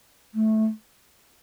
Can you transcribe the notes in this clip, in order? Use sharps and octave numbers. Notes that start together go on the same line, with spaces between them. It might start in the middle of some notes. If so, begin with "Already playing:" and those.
A3